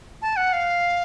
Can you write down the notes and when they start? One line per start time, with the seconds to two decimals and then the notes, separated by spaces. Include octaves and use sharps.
0.22 A5
0.36 F#5
0.53 F5